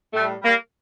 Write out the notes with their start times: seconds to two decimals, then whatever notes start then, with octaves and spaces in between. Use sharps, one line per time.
0.13 A2 G3 A3
0.42 G3 A#3